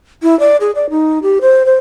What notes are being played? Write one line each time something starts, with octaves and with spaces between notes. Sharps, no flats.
E4
D5
G#4
D5
D#4
G4
C5
C5